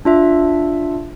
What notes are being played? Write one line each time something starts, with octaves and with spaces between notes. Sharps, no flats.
D4 F4 E5